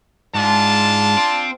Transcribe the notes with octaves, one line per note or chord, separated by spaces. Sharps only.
G#2 D4 F4 A5
C4